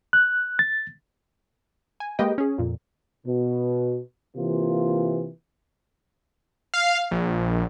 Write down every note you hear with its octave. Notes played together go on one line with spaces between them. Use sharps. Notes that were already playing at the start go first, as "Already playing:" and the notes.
F#6
A6
G#5
G#3 A#3 G4 B4 D#5 G5
C#4 G#4
F2 A#2
B2
C3 E3 A#3 F4
F5
A#1